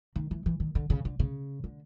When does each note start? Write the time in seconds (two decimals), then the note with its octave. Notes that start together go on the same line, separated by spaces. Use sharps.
0.16 D#3
0.31 E3
0.46 E3
0.60 D#3
0.75 D3
0.90 C#3
1.05 D3
1.19 C#3
1.64 D3